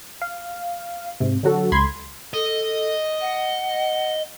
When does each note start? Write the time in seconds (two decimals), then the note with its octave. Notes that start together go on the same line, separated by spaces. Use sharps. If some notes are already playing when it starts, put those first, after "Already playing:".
0.22 F5
1.20 G#2 C3
1.43 D3 F#3 F#4 A4
1.72 C#2 B5 C6 G#6
2.34 A4 D#5
3.21 F#5